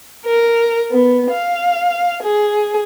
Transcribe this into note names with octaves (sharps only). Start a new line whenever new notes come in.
A#4
B3
F5
G#4